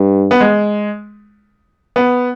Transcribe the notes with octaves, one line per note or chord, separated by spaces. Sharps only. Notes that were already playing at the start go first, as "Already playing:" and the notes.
Already playing: G2
B3
G#3
B3